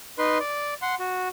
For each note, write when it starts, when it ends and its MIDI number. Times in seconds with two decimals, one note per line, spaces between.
0.18 0.38 63
0.18 0.38 71
0.18 0.38 84
0.40 0.74 74
0.82 0.95 78
0.82 0.95 84
1.00 1.29 66